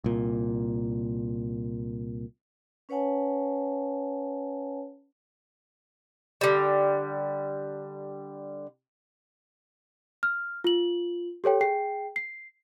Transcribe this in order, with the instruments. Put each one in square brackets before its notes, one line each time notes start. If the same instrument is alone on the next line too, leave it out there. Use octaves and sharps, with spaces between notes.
[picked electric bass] C2 A#2
[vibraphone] C#4 B4 C#5 F#5 G#5 A5
[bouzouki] D3 G3
[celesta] F6
F4 F#7
G4 A4 C#5 G5
G#4 G5 C7
C7